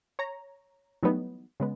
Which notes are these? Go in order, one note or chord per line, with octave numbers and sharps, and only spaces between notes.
C#5 A#5
E3 F#3 G3 A3 B3 D#4
C#3 G#3 B3